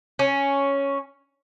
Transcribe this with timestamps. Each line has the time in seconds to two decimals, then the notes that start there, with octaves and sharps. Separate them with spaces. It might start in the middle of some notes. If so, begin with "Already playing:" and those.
0.19 C#4